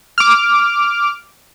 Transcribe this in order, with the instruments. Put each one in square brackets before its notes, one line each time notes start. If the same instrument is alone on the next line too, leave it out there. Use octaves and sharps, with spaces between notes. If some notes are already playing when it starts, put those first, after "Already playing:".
[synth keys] D6 F6